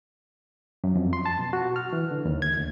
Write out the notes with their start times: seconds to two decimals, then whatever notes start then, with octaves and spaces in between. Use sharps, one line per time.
0.84 F#2
0.96 F2
1.13 C6
1.26 A5
1.39 B2
1.53 F#4
1.76 F6
1.93 E3
2.11 D3
2.25 D#2
2.42 G#6
2.57 D2